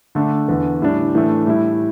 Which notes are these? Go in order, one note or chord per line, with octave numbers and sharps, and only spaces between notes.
D3 A3 D4
E2 D3 B3
A2 G3 D4
A2 E3 A3 D4
A2 G3 E4